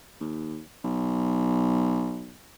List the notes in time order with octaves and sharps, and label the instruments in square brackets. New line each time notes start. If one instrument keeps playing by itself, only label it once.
[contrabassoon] D#2
B1